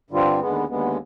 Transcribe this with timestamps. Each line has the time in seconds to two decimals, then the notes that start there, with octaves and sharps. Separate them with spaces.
0.11 G2 D3 G3 C4 F4
0.39 D#2 D3 G#3 B3
0.68 D#2 D3 G#3 B3